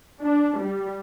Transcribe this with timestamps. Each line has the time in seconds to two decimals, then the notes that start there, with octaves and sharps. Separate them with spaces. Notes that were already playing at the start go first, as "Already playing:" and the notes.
0.22 D4
0.60 G3